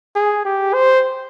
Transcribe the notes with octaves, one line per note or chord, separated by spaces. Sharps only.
G#4
G4
C5